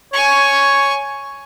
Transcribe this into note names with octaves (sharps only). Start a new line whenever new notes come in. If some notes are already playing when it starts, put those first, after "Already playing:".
C#5 G#5 C#6